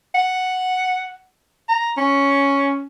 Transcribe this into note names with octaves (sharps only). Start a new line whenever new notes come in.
F#5
A#5
C#4